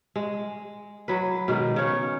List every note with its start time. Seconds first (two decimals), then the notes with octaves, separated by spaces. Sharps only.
0.16 G#3
1.08 F#3 B4
1.48 B2 D#3 G#3
1.76 C#3 C#5